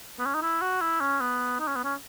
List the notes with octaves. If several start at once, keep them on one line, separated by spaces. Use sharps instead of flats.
B3
C#4
D#4
E4
F#4
E4
C#4
B3
D#4
C#4
B3
C#4